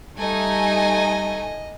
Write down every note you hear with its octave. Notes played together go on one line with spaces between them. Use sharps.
G3 A3 D#4 D#5 G#5